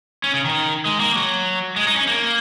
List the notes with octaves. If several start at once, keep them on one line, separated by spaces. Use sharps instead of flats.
C#4
C#3
D#3
G#3
A#3
F#3
G#3
D#4
C#4
A#3